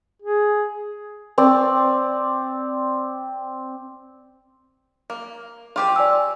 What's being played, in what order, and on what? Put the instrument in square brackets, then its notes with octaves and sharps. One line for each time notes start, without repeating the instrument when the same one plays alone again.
[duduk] G#4
[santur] C4 D5
[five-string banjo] A#3
F4 G4 C5
[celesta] D5 G#5 E6